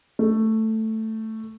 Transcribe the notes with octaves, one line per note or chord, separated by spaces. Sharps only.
A3